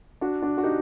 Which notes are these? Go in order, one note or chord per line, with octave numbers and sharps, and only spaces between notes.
D4 F#4
D4 F#4
F#4
D#4 G4